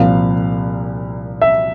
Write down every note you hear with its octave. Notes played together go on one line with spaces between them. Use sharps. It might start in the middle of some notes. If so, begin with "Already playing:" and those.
Already playing: C2 A#2 F3 F5
E5